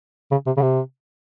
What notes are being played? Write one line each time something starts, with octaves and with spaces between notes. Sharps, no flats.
C#3
C3
C#3
C3